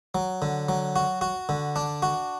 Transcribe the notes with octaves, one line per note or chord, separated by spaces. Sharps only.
F#3
D3
F#3
F#4
F#4
D3
D4
F#4